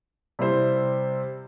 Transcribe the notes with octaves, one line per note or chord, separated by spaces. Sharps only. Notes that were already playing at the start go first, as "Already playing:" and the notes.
C3 G3 E4 C5